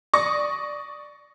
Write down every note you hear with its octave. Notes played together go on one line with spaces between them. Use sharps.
D5 C#6 D#6 A#6